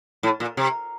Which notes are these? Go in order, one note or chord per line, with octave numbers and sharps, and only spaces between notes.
A2
A#2
C3